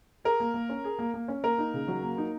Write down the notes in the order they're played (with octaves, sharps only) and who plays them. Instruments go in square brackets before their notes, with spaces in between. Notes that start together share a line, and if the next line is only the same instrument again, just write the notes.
[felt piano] G#4 [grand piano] A#4
[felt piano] A#3
A#3
C#4
G#4
A#3
A#3
C#4
[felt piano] A#3 [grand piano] A#4
[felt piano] D#4
C#3
F#3
A#3
D#4